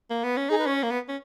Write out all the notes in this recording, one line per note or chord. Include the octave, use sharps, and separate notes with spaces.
A#3
B3
C#4
D#4 G#4
B4
C#4 C#5
A#3
B3
C#4